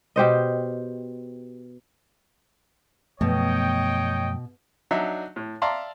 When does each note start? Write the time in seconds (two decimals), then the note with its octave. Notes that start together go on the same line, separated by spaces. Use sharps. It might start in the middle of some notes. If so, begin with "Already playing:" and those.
0.16 B2 G4 C5 D#5
3.21 F#2 B2 F3 A3 C#5 D#5 G5
4.91 F#3 D4 D#4 E5
5.36 A2
5.62 D5 E5 F5 A5 A#5 C6